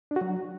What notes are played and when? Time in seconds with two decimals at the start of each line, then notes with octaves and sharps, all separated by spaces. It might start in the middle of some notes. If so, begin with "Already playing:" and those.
0.11 D4
0.16 F#4
0.21 F#3